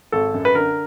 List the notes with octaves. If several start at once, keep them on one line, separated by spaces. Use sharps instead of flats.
G#1 A4
F#2
B4
D3 A#4